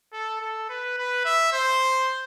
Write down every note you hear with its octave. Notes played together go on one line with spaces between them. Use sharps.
A4
A4
B4
B4
E5
C5